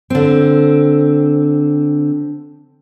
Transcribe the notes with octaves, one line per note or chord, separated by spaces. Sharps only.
D3 C4